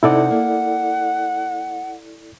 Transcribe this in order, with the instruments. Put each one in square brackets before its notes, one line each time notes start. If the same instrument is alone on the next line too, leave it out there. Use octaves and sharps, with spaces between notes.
[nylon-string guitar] C3 D#4 [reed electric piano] E4 A4 D5 [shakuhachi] F#5
[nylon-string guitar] A#3